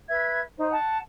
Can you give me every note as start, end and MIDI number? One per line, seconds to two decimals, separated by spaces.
0.09 0.40 71
0.09 0.40 76
0.09 0.40 92
0.57 0.72 63
0.57 0.72 72
0.72 0.97 78
0.72 0.97 81